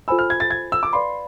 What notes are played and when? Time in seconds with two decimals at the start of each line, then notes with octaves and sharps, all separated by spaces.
0.08 F4 A4 C5 G#5 B5 E6
0.19 F6
0.30 G#6
0.40 A6
0.50 G#6
0.72 E6
0.83 D6
0.93 B4 D5 F5 B5 C6